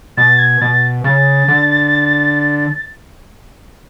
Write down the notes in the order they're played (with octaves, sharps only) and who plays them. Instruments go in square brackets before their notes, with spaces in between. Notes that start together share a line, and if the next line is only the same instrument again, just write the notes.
[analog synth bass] B2 [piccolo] A6
[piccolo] G#6
[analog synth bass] B2 [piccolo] A6
[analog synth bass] C#3 [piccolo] A6
[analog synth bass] D3